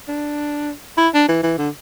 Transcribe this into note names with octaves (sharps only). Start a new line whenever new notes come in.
D4
E4
D4
E3
E3
D3